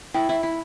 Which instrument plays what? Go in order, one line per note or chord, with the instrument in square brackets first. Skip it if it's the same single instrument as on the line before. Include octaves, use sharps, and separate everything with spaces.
[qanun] E4 [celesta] G5
[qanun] E4
E4